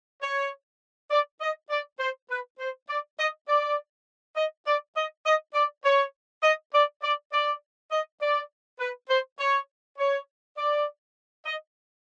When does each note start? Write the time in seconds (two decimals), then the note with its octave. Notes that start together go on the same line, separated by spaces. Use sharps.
0.21 C#5
1.11 D5
1.40 D#5
1.70 D5
1.99 C5
2.30 B4
2.59 C5
2.89 D5
3.18 D#5
3.48 D5
4.36 D#5
4.66 D5
4.96 D#5
5.25 D#5
5.54 D5
5.84 C#5
6.43 D#5
6.73 D5
7.02 D5
7.32 D5
7.91 D#5
8.21 D5
8.80 B4
9.09 C5
9.39 C#5
9.99 C#5
10.57 D5
11.45 D#5